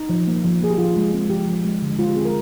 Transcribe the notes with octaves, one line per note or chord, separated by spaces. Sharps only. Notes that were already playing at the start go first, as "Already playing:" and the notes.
Already playing: D#4
F3
A#3
F3
A#3 G#4
G4
F3 F4
G#3
C4
F3 G4
F3
G#3
D3
G#3 F4
G4
C4 G#4
A#4